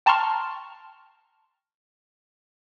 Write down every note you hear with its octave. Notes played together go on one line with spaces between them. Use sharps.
G5 A5 A#5 C6 C#6 F6